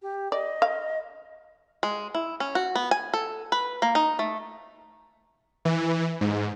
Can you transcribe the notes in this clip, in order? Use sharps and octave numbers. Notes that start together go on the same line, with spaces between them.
G4
D5 D#5
F5
G#3
E4
C#4
F#4
B3
G#5
A4
B4
A#3
D#4
A3
E3
G#2